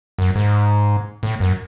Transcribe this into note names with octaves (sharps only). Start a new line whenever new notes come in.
F#2
G#2
A2
F#2